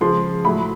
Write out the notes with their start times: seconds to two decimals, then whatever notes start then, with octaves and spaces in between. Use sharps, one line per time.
0.01 C#3 F3 G#3 C6
0.45 A2 F#3 A3 B5